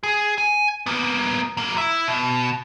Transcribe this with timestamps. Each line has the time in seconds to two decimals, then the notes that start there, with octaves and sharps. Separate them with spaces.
0.03 G#4
0.38 G#5
0.86 A#3 B3
1.57 F#3 A#3
1.78 E4 E5
2.08 B2